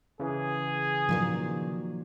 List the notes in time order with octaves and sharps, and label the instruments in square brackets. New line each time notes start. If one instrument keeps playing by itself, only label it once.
[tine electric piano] C#3 E3 [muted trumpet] G#4
[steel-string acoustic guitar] A#2 D#3 F#3 [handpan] F3